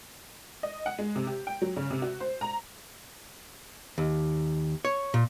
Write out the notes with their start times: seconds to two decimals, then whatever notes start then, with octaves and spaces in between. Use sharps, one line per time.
0.63 D#5
0.86 F#5
0.99 G#3
1.16 C3
1.27 G4
1.47 G5
1.62 F#3
1.76 C#3
1.91 C3
2.02 F#4
2.20 C5
2.41 A#5
3.98 D#2
4.85 C#5
5.14 A#2